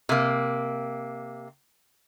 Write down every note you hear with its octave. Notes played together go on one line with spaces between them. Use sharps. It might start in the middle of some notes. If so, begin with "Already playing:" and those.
C3 A#3